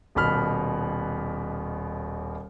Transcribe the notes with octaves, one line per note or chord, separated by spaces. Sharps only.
D#1 D#2 B2 B5 F6